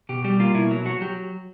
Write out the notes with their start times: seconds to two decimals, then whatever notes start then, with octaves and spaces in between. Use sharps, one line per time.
0.09 B2 G4
0.24 G3 G4
0.40 A#3 F4
0.54 B2 E4
0.71 F#3
0.85 F#3 F#4
1.01 F#3 G4